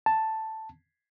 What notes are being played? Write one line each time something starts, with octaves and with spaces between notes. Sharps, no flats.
A5